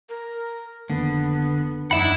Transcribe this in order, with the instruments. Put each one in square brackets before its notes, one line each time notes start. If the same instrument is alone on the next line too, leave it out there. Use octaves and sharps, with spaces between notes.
[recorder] A#4
[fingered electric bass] F1 D#3 A#3 [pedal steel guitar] D3 [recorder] B3
[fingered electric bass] E1 F#2 [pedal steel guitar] D4 F#5 [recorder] D#4 [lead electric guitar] E5 B5